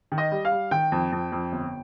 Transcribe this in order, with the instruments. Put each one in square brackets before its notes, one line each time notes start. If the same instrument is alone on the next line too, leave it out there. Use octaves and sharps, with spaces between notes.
[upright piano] D#3
D#5
G3
F5
G3
D#3 G5
F2
F2
F2
G1